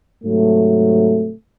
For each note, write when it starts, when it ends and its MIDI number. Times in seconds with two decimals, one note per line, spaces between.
0.24 1.32 44
0.24 1.32 48
0.24 1.32 54
0.24 1.32 57